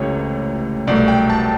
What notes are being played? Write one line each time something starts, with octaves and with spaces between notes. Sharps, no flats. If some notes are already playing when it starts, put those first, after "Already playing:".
Already playing: C#2 C3 E3 A3 C#5
C2 B2 F#3 A3 D5
G5
A5